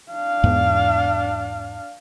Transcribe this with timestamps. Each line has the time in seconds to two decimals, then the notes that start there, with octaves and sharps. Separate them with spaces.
0.12 D4 F5
0.44 E2 G#2 B3